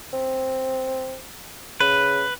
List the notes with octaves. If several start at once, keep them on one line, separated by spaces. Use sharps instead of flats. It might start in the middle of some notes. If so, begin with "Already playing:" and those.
C4
C#3 B4